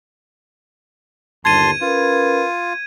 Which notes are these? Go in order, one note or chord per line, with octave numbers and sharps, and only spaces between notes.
G1 D#2 A5 C6 G#6 D#7
C#4 F4 A#4 B4